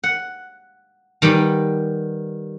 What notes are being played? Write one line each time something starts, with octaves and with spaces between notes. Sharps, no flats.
F#5
D#3 G3 B3 B4